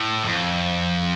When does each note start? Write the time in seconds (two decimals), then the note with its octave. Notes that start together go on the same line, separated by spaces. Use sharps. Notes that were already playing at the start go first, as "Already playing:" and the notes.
Already playing: A2
0.24 F2